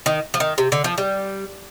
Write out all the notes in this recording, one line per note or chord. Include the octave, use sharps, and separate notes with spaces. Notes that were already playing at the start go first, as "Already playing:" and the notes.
D#3
F3
D#3
C3
D3
F3
G3